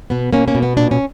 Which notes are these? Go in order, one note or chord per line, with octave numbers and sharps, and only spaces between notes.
B2 B3
B2 A#3 C#4
A#3 C#4
B2
B3
A#2 D4
C#4